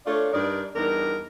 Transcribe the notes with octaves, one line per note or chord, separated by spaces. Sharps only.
A3 D4 F4 C#5 D5
G2 D#4 A#4 D5
E2 G3 D4 D#4 A#4